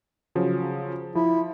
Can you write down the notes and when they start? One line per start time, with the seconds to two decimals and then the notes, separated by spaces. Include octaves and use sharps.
0.35 C#3 F3 F#3
1.15 F3 E4